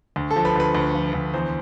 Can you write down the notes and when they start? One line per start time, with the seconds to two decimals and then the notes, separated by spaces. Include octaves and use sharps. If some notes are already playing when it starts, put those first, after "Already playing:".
0.16 D2
0.31 A4
0.36 F3
0.45 B4
0.55 D2 B4
0.75 D2
0.94 F3
1.14 D2
1.33 E2 C5